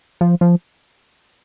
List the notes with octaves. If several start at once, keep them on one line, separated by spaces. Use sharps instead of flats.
F3
F3